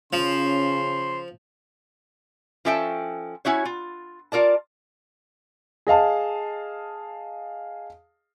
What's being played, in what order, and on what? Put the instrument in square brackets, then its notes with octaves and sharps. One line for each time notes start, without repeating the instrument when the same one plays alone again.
[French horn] C#3 [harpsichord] F3 [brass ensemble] C#4 [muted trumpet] C6
[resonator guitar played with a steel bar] F3 C#4 A4 E5 G5 A5
C#4 E4 F#4 C#5
F4
F4 A#4 D5 A5
[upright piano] G#4 D#5 F5 A5